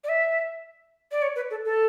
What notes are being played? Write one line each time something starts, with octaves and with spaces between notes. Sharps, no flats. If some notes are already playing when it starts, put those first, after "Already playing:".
D5
E5
D5
C#5
B4
A4
A4